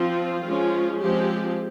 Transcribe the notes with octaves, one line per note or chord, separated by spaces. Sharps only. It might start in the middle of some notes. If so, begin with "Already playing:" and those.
Already playing: F3 C4 F4
F3 G#3 C#4
F3 G#3 C4 G4